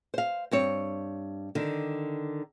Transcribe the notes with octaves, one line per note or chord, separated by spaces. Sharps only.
C5 F5
G2 C4 C#5
D3 D#3